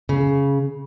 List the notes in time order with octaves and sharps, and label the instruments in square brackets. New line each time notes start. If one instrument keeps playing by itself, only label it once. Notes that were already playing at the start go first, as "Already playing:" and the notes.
[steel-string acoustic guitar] C#3